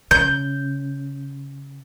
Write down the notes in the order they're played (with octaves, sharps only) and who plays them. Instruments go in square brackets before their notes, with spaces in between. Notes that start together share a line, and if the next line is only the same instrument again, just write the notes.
[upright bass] C#3 [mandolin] G6